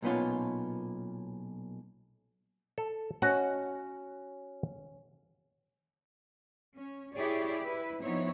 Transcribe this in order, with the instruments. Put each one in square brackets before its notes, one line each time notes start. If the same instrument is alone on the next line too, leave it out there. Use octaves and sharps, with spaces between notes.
[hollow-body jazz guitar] B1 A#2 B3 C#4 F4
[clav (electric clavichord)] A4
[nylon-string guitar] C#4 [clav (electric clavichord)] F#4 D#5 F#5
[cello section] C#4
E4 G4 G#4 C#5 D5
E4 B4
F3 B3 C4 D#4 E4 C#5